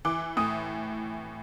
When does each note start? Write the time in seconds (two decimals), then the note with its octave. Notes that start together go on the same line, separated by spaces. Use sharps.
0.05 E3 D6
0.37 A2 D#6